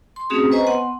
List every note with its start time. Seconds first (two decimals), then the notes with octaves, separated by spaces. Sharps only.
0.16 C6
0.30 A3 C4 C#4 F#4 G#4 D#6
0.51 B4 C5 D#5 G#5 A#5 C#6
0.66 B3 F#5 C6